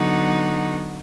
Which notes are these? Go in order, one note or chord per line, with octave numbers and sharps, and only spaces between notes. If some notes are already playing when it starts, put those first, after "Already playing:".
Already playing: D3 F#3 B3 D#4 F#4